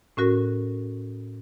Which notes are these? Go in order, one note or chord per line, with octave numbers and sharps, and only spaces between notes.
A2 C#4 F#4 A#4